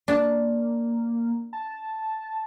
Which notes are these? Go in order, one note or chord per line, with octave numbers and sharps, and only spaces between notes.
A#3 D4
A5